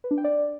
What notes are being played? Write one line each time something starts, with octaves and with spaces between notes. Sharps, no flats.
B4
D4
G5
D5